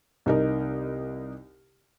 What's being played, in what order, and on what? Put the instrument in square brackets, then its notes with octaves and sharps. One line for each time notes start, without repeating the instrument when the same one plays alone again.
[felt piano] C2 D#4 A#4